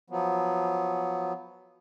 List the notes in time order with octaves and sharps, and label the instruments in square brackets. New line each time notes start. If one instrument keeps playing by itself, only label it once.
[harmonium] F3 F#3 B3